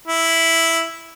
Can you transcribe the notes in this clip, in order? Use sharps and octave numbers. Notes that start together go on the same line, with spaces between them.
E4